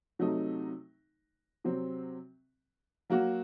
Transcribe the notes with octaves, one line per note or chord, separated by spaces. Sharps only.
C3 F#3 A3 D#4
C3 F#3 C4
F#3 A#3 F#4